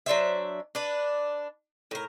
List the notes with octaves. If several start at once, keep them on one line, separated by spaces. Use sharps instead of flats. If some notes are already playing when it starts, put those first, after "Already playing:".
F#3 D4 C5 E5
D4 B4
A2 A#4